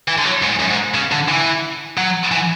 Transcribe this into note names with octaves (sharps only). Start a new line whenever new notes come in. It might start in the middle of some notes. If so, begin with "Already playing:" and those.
E3
D3
F#3
G#2
F#2
G#2
C#3
D3
E3
F#3
E3